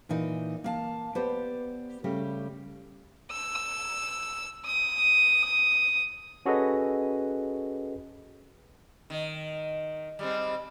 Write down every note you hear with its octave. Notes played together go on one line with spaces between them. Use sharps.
A#2 E3 D#4 A#4
A#3 F5 A5
B3 G4 C5 D5
C#3 G3 A3 G4
E6
D#6
C#4 F#4 G#4 A4 B4 D#5
D#3
G3 G#3 C4